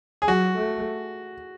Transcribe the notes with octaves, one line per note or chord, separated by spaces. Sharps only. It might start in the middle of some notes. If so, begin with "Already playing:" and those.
G#4
F#3 F#4
A3